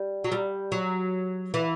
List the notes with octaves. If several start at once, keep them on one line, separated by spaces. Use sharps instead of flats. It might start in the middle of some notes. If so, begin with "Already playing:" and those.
Already playing: G3
F#3
G3
F#3
E3